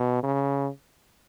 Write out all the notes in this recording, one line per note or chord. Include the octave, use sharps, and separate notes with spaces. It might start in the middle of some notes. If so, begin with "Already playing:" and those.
Already playing: B2
C#3